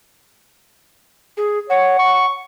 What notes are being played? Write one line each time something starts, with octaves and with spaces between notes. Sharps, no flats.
G#4
C#5 F#5
C#6